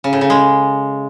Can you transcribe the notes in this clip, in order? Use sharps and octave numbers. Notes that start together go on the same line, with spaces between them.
C#3
A2
C#3
G#3